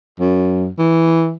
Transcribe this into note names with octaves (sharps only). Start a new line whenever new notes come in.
F#2
E3